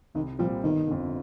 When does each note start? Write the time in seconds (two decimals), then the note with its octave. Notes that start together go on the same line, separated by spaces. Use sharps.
0.15 C2 D#3
0.39 A#2 F3 G3 C4
0.64 G1 D#3
0.88 F2 D3